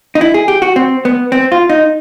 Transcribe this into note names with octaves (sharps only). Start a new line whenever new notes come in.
D#4
E4
G#4
G4
F#4
C4
B3
C4
F4
D#4